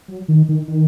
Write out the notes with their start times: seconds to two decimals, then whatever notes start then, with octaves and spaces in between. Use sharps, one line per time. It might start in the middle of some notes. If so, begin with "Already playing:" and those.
0.08 F#3
0.28 D#3
0.49 D#3
0.68 D#3